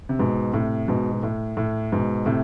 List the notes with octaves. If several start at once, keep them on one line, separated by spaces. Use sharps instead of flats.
C3
G#2 B2
A2 C3
G#2 B2
B2
A2
A2
G#2 B2
A2 C3